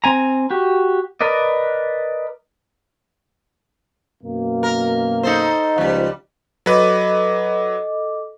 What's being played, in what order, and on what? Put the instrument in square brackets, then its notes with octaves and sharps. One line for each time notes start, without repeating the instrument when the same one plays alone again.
[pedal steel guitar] C4 G#5 A#5
F#4 G4
A#4 B4 D5 D#5
[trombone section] F#2 B2 A#3
[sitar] A#4
D#4 A4 C5
[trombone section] C#2 C5 [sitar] F3 G3
[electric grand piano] F#3 B4 [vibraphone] A4 D#5 D6